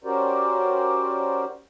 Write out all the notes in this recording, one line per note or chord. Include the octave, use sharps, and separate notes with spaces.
C#4 F#4 G4 A#4 C5 D5